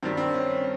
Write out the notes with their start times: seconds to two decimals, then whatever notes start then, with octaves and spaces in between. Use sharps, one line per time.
0.03 G2 D#3 G3 C4
0.17 C4
0.34 C#4